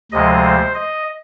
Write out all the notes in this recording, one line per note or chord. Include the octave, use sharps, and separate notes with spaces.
D2 C3 F3 G#3 D#5
C5
D#5